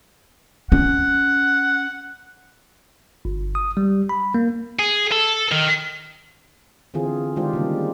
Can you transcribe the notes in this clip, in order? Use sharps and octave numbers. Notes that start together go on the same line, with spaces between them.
C#4 F#5
G1
D#6
G3
B5
A#3
G#4
A4
D#3
D3 E3 C4 F4 G#4
D#3 G#3 D4 F4 G4 C5
C#3 G3 A#3